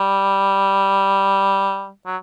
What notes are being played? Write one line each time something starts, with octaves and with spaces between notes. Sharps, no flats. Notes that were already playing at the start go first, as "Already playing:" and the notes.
Already playing: G3
F#3